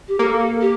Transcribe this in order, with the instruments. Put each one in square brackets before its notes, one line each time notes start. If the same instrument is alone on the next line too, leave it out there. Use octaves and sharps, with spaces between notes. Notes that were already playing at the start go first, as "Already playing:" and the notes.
[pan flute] G4
[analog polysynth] A#3 [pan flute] A4
[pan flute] G4